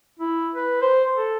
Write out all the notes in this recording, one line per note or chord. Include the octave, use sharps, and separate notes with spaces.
E4
B4
C5
A4